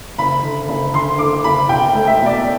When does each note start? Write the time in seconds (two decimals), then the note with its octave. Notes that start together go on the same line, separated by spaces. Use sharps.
0.18 F#1 B5
0.43 D3
0.69 F#1
0.94 D3 C6
1.18 D3 D6
1.44 F#1 B5
1.69 B1 G5
1.94 A3
2.07 E5
2.20 B2
2.26 D5